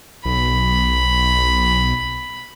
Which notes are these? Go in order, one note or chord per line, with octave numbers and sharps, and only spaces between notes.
B1 B5